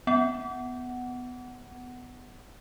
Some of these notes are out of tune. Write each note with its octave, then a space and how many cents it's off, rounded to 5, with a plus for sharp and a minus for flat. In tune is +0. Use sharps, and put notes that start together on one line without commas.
B3 +10 F#5 +5